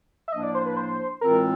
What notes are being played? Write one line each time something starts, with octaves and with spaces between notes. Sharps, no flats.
E5
A2 F3 A#3 D4 D#5
D5
C5
B4
C5
A2 E3 G#3 C4 F4 A#4